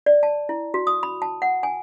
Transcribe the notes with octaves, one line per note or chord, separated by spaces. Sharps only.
D5
A5
E4
F#4
D#6
B5
A5
F#5
G#5